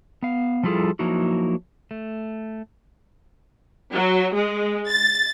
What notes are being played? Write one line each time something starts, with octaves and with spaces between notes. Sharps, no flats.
B3 F5
F3 G3 E4 F4 G#4 A4
F3 F#3 A#3 D#4 E4 F#4
A3
F#3
G#3
A6